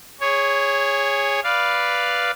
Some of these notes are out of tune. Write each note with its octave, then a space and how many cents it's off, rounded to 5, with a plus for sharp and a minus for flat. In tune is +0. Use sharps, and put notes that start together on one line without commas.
G#4 -15 C#5 +0
B4 +0 D5 +0 F5 +0